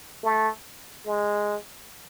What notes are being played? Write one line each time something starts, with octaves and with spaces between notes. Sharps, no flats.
A3
G#3